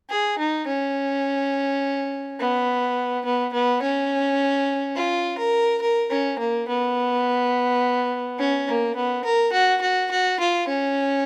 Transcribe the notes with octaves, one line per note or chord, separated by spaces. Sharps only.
G#4
D#4
C#4
B3
B3
B3
C#4
F4
A#4
A#4
C#4
A#3
B3
C#4
A#3
B3
A#4
F#4
F#4
F#4
F4
C#4